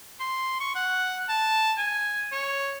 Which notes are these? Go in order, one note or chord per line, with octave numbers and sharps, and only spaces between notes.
C6
C#6
F#5
A5
G#5
C#5